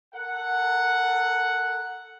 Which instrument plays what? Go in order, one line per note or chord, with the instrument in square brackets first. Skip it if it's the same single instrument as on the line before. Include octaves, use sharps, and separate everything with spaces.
[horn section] A4 A#4 F#5